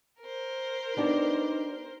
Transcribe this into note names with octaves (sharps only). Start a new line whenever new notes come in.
A#4 C5
B3 D4 D#4 G4